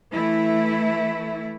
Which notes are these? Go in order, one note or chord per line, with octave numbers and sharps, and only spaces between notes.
E3 A3 E4